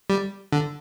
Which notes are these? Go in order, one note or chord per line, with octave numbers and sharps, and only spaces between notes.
G3
D3